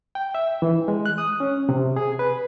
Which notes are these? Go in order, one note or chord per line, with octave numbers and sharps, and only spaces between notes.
G5
E5
E3
G#3
F#6
D#6
C#4
C3
G#4
B4